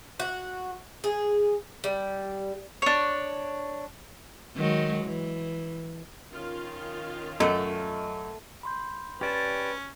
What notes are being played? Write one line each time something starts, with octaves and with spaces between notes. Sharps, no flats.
F#4
G#4
G3
D4 C#5
D#3 F#3 G#3
E3
D#3 C#4 F4
F#2 A3 D#5
B5 C6 G6
C#4 G4 B4 D5 A5